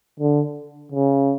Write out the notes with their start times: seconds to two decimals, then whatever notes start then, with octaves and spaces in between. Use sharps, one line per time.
0.20 D3
0.92 C#3